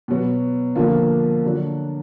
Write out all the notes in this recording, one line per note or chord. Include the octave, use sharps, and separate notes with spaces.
B2 F#3 B3
D3 F3 A#3 F4
D3 F#3 D4